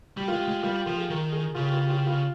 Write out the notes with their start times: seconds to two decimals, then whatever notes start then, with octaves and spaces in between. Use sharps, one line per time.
0.17 G3 G4
0.28 G#3 F4
0.40 G4
0.48 G#3
0.63 G3 F4
0.75 G4
0.86 F3 F4
0.98 G#4
1.10 D#3 A#4
1.32 G#4
1.55 C#3 F4
1.64 G4
1.73 F4
1.80 G4
1.89 F4
1.98 G4
2.06 F4